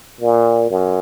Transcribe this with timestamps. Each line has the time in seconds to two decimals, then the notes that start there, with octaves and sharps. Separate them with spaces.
0.21 A#2
0.71 F#2